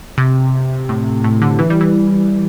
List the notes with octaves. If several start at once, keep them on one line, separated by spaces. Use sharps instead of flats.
C3
A2
A2
D3
E3
G3
E3